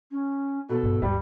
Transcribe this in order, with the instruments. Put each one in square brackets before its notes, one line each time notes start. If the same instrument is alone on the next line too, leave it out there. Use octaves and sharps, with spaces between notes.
[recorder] C#4
[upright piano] B2 [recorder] A4
[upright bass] G2
[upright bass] D2 G2 [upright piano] G3